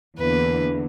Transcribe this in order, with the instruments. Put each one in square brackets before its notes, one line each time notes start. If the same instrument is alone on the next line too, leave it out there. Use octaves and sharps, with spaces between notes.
[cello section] E2 D3 A#3 [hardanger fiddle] B4